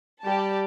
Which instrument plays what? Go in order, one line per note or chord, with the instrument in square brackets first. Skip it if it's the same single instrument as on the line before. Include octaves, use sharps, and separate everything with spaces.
[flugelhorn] G3 [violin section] G4 D5 A5